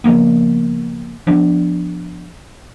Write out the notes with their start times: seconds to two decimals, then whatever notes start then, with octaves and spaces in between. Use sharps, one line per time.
0.04 C#3 F3 A#3 B3
1.27 F3 B3 D4